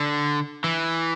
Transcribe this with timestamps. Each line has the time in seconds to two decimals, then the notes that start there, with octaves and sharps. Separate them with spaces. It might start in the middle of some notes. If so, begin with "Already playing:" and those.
Already playing: D3
0.64 E3